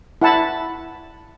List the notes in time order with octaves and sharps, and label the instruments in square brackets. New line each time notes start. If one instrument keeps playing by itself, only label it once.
[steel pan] E4 F#5 A5 B5